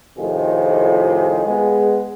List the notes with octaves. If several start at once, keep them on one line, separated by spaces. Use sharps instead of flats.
F2 A2 C3 D#3 F4 G#4
G#3 B3 G#4